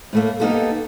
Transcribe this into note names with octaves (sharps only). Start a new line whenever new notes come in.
A2 A3 A#3
A#3 B3 D#4 F#4 G4 A4